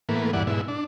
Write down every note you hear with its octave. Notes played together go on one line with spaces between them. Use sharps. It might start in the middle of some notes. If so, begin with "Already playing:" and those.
A2 E3 A#3 B3
E2 G2 E3 D5 F#5
G#2 B2 E4
D4